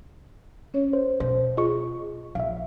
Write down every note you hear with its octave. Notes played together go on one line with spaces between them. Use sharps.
C#4 C#5
C5
B2 C5
F4 G#4 D#5 C#6
A#1 E5 F5